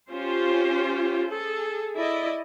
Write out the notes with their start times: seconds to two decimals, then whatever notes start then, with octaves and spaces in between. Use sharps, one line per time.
0.11 C#4 F4 G4 C5
1.28 G#4 A4
1.95 E4 D5 D#5